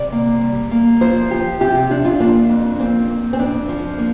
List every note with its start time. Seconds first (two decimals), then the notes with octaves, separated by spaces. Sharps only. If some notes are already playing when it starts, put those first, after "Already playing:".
Already playing: C3 D5
0.12 A#3
0.41 G3
0.71 A#3
1.01 F3 C5
1.31 F3 G4
1.60 C3 G4
1.90 F3 D4
2.05 F4
2.20 A#3 D4
2.49 F2
2.79 A#3 C4
3.09 A#3
3.33 C4
3.39 F2 D4
3.69 F3
3.98 A#3